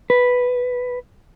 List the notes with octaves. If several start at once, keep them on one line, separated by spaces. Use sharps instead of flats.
B4